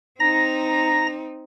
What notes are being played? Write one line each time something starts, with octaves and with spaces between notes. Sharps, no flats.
C4 D#4 A#5 A#6